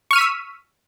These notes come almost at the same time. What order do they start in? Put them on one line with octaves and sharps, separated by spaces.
C#6 F6 D#7 B6 E6